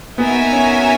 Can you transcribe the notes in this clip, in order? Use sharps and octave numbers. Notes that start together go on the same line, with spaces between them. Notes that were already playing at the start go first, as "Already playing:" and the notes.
B3 D#4 F#4 A#4 E5 G#5
C#4